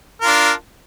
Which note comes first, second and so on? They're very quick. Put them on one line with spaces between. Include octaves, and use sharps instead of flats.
A#4 F4 D4